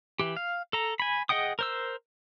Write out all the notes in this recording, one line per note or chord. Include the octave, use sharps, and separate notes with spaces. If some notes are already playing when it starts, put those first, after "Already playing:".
E3 G4
F5
A4 A#5
G#5 B5
G#4 D#5 F#5 G5 D#6
A#4 C5 E6